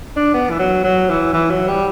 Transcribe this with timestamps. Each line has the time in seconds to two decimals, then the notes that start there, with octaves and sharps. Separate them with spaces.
0.16 D4
0.33 B3
0.50 E3
0.59 F#3
0.84 F#3
1.09 E3
1.33 E3
1.50 F#3
1.67 G3